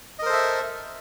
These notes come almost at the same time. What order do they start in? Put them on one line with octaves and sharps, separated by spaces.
D#5 A#4 C5 A4 E5